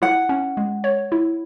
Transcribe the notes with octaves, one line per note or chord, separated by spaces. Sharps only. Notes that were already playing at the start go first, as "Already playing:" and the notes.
E4 F#5
C#4
G#3
C#5
E4